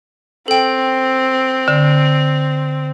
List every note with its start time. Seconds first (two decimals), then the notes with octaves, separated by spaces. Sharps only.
0.48 C4 A4 G5
1.68 D3